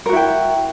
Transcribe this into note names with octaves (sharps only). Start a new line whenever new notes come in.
E4 F#4 A#4 G5